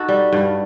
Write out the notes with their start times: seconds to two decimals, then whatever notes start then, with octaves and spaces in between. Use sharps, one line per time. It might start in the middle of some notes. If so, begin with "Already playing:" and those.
Already playing: D#4 F#4 A4
0.08 G3
0.33 G2